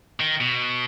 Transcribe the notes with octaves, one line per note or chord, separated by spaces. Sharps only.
D#3
B2